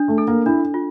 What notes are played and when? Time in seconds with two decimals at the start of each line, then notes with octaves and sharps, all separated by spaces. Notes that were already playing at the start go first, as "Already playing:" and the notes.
Already playing: D4
0.08 A3
0.18 A4
0.28 A#3
0.46 D4 E4
0.74 F4